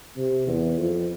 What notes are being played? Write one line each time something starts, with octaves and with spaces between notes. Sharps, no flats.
C3
E2
F2